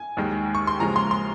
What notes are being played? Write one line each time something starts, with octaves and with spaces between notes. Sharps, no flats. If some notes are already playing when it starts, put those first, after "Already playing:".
Already playing: G#5
D#2 D#3 G#3
C#6
C6
D#2 C#3 F3 G#3 A#5
C6
C6